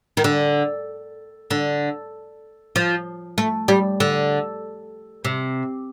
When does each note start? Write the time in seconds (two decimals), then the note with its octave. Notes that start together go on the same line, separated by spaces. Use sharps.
0.17 D#3
0.24 D3
1.51 D3
2.76 F3
3.38 A3
3.68 G3
4.00 D3
5.25 C3